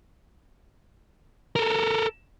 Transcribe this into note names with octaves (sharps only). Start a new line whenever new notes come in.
A4 A#4